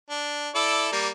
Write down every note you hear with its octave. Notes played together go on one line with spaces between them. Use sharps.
D4
E4 A4 D5
G3 A#3